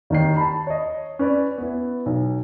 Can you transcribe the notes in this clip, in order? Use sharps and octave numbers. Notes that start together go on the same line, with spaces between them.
D#2 D#3 C7
A5 B5
C#5 D#5
C#4 B4 D5
B3 E4
B1